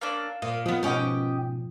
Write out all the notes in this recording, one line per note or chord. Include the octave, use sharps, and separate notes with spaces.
A#3 C#4 D4 F5 E6
A#2 F5 D#6
D#3 F3 B3 D#6
G#2 B2 B3 C#4 G4 D#5 G5